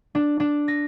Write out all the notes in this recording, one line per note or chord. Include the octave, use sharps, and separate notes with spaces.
D4
D4
A#6